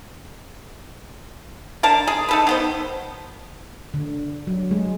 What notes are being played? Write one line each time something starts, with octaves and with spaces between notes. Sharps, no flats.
D3 A#4 A5
G#4
D#4 A4 B4
D#3 B3 C5
D3
F#3
G#3